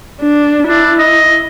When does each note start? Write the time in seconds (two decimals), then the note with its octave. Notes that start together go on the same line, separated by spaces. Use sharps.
0.21 D4
0.68 D4 E4
0.99 D#5